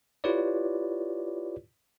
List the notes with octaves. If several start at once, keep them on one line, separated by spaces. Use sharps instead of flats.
E4 F4 G4 B4 C#5 D5